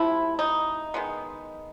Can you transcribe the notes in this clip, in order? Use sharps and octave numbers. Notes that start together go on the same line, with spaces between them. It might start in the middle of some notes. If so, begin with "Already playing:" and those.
Already playing: C3 F3 A3 E4
D#4
D#3 G#3 B3